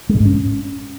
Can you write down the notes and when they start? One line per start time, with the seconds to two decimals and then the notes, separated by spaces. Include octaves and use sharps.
0.09 G#3
0.15 B2
0.20 G#2
0.26 C#4